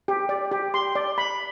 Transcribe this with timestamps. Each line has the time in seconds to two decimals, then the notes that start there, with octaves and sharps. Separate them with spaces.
0.08 G4
0.29 D5
0.51 G4
0.74 C6
0.95 D5
1.18 B5